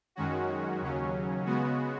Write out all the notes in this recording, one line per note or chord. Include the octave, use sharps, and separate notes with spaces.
F#2 D#3 G#3 C#4 F#4
D#2 C#3 F#3 C#4
C#3 G#3 B3 F#4